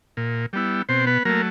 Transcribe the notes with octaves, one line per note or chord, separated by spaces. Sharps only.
A#2
G3 B3 E4
B2 C4 C5
B3 B4
F#3 A3 A#3 A#4